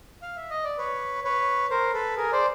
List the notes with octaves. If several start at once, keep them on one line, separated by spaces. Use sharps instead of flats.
F5
E5
D#5
D5
B4 C#5
B4 C#5
A#4 C5
A4 B4
G#4 A#4
C5 D5